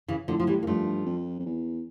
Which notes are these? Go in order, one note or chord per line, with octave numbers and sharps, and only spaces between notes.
C#3 E3
A2 D3 F3
F3
E3 G3
A#3
G2 F3 A3
F2
F2
E2